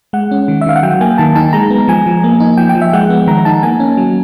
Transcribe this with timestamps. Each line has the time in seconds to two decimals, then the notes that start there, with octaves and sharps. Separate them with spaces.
0.13 G#3 F#5
0.31 C#4
0.48 D#3
0.61 E5
0.66 D#3 F5
0.76 F#5
0.83 F#3 G5
1.01 A#3 G#5
1.18 D#3 A5
1.35 D#4 A5
1.53 G#3 A#5
1.70 B3
1.88 F3 G#5
2.06 F3
2.24 A#3
2.40 D#4
2.57 F3 G5
2.69 G5
2.75 F3
2.81 E5
2.93 G#3 F#5
3.10 B3
3.27 D#3 A#5
3.45 D#4 A5
3.63 A#3 G#5
3.80 C#4
3.97 F#3